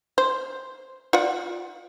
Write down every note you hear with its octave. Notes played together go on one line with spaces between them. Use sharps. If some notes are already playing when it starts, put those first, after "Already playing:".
C5
F4 D5 F#5